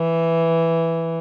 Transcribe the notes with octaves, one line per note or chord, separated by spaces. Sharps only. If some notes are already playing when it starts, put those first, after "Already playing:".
Already playing: E3